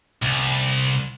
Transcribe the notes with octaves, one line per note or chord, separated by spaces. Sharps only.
C2